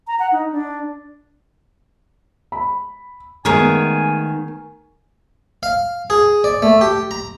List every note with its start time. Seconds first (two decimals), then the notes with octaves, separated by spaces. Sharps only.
0.07 A#5
0.19 F#5
0.32 D#4
0.52 D4
2.52 B5
3.45 D#3 G#3 A3 B3 G#4 A#4 C#5 G#5
5.63 F5
6.10 G#4
6.44 D5
6.62 A3
6.81 G4
7.11 A#5